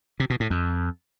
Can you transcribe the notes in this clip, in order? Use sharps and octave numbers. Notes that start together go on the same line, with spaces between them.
C3
B2
A2
F2